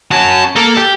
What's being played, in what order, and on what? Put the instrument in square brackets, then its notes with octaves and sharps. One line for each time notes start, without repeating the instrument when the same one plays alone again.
[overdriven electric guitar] C#4 F#4 [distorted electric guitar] A5
[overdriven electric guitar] A#3 [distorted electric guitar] A4
[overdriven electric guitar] G4